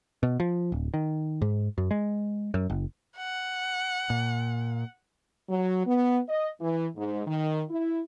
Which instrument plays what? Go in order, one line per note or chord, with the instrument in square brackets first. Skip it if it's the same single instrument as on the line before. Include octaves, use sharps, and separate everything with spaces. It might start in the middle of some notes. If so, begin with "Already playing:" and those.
[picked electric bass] B2
F3
D1
D#3
G#2
F#2
G#3
F#2
F#1
[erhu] F#5
[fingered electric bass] A#2
[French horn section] F#3
B3
D#5
E3
G#2
D#3
E4